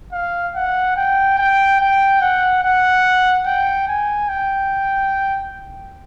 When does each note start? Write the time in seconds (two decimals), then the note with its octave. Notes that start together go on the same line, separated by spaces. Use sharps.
0.13 F5
0.55 F#5
0.96 G5
1.38 G5
1.80 G5
2.21 F#5
2.63 F#5
3.46 G5
3.88 G#5
4.29 G5